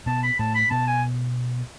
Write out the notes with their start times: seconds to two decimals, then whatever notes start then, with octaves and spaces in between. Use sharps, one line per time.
0.06 B2 B3 A5
0.23 B5
0.39 A2 A3 A5
0.55 B5
0.71 B2 B3 A5
0.87 G#5